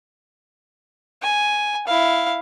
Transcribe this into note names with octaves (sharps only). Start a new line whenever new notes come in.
G#5
E4 F5